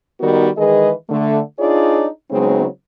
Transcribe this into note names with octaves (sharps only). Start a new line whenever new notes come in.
D#3 G3 B3 D#4 F#4 A#4
D#3 E3 G#3 G#4 B4 D#5
D3 A3
D4 D#4 F4 G#4 C#5 D5
C#3 F#3 G#3 B3 C4 D#4